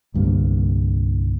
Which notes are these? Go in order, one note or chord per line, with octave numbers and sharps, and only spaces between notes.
C2 G2 D3 A#3